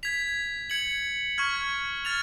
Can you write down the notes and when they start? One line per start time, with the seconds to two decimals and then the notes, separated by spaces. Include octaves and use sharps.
0.03 G#6 B6 F7
0.70 G#6 C#7 F#7
1.38 C#6 F6 G#6
2.05 F6 A6 F7